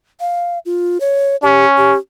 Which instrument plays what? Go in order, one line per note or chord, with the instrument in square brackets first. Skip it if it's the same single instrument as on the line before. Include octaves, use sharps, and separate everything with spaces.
[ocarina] F5
F4
C#5
[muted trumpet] C#4 [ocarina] G4
[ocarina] G4